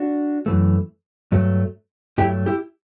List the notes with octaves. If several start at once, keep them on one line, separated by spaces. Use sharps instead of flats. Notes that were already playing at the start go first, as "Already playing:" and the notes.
Already playing: D4 F#4
F#2 E3 A3
G2 F#3 A3
G2 F#3 A3 E4 G4
E4 G4